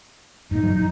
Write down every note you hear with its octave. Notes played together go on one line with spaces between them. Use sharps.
G2 A#2 D#4
F#2 E3 F#3